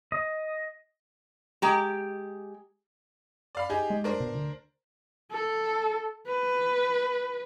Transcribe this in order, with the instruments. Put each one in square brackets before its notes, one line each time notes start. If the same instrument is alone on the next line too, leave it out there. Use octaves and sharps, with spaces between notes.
[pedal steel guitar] D#5
[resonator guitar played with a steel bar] G#3 G4 A#5
[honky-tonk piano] D5 F5 B5
D#4 G4 G#4
[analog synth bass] G#3
[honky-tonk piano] D4 A#4 C5
[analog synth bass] B2
D2
[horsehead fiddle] A4
B4